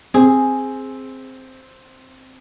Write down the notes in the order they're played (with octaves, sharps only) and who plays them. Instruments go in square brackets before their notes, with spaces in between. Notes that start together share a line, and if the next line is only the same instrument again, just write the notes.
[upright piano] C4 [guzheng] G#4